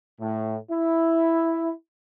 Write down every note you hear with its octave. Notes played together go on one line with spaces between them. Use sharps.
A2
E4